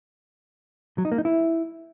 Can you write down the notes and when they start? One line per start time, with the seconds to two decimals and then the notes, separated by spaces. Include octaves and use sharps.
0.98 F#3
1.05 D#4
1.12 A#3
1.18 D#4
1.25 E4